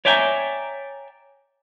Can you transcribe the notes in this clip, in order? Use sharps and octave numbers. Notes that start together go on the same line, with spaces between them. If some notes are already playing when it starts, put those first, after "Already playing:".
C#5 D5 E5 G5 G#5 A#5